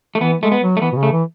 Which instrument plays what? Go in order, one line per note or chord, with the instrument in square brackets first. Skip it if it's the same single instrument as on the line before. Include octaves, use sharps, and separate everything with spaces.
[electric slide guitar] A3
[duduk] E3 [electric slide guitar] B3
[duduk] G#3 [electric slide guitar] A3
[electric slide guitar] B3
[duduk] F#3
[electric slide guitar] A3
[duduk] E3 [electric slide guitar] B3
[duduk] B2
C#3
[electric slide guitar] A3
[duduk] E3